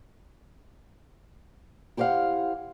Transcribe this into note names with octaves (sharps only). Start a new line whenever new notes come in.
E4 G4 C5 D#5 F5 F#5